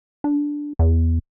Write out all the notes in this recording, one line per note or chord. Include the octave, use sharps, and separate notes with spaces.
D4
E2